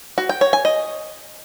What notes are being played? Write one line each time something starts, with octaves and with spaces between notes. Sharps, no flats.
F#4
G5
C#5
G#5
D#5